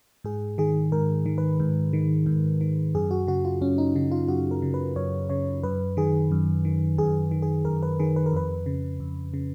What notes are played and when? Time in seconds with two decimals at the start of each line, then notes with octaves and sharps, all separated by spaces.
0.24 G#2 G#4
0.58 D#3 G#4
0.92 G#2 A#4
1.26 D#3
1.38 B4
1.60 G#2
1.93 D#3
2.26 G#2
2.61 D#3
2.95 F#2 G#4
3.11 F#4
3.27 C#3 F#4
3.45 F4
3.61 F#2 C#4
3.78 D#4
3.96 C#3 D#4
4.11 F4
4.28 F#2 F#4
4.51 A#4
4.62 C#3
4.74 B4
4.96 F#2 C#5
5.30 C#3 C#5
5.63 F#2 B4
5.97 D#3 G#4
6.31 F#2
6.65 D#3
6.98 F#2 G#4
7.31 D#3
7.42 G#4
7.65 F#2 A#4
7.83 B4
7.99 D#3 G#4
8.16 B4
8.26 A#4
8.32 F2 B4
8.66 C#3
9.00 F2
9.34 C#3